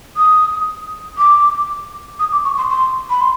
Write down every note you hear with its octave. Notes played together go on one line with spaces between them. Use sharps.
D#6
D6
D#6
D6
C#6
C6
C6
B5
C6